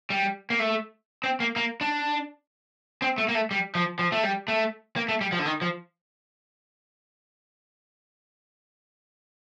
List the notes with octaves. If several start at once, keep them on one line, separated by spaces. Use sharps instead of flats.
G3
A#3
A3
C4
A#3
A#3
D4
C4
A3
A#3
A3
G3
F3
F3
A3
G3
A3
A#3
A3
G3
F3
D3
D#3
F3